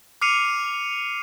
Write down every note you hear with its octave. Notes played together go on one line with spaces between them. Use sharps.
D6 F6 C7 C#7 D#7 F7